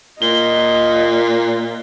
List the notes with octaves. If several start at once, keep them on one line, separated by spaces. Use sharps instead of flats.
A#2 D#5 G7